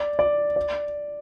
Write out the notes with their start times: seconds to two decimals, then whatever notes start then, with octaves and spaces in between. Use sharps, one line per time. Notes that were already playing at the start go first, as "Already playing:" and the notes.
Already playing: D5
0.19 D5
0.56 D5